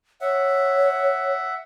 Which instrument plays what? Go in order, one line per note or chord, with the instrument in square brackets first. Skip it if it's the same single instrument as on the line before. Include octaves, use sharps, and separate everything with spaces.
[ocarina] C#5 [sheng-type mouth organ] E5 F#5